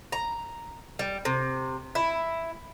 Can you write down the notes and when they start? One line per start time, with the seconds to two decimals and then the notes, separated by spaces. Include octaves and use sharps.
0.12 A#5
0.99 G3
1.25 C3
1.95 E4